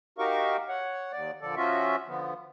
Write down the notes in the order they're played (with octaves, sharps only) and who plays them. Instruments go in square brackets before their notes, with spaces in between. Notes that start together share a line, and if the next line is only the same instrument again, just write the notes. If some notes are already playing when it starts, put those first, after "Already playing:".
[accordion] D#4 F#4 G4 A#4 F5 C#6
C#5 F#5
D#2 D5
A#2 D3 F3 A4 D5
F3 C#4 F4 F#4 E5
D3 F3 B3